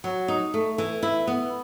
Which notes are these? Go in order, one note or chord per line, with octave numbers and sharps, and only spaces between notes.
F#3
D#4
A3
E3
E4
B3